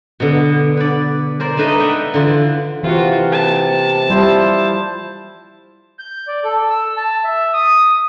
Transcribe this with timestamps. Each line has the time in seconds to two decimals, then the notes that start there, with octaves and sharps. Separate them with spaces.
0.20 B2 D3
0.77 B4 D5
1.40 A#4 C5 D5
1.57 A3 D4 D#4 B4 D#5
1.80 E5 F#5 G5 A#5
2.14 D3 E3 F4
2.83 C3 E3 F4 F#4
3.32 A5
4.10 F3 G3 E4 C5
5.99 G6
6.28 D5
6.44 A4
6.70 E6
6.97 A5
7.24 E5
7.53 D#6